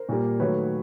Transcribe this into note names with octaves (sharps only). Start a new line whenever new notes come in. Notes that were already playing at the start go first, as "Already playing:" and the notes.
Already playing: A#4 C5
A#2 G3 A#3
D#3 F#3 A3 B4 C#5